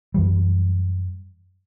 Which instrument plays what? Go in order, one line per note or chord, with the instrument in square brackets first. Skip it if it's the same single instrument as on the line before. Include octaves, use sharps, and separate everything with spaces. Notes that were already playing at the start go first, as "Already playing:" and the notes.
[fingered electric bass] F#2 E3 G3